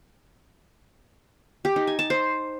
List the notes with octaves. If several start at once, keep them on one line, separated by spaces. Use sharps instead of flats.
G4
D#4
G#5
A5
C5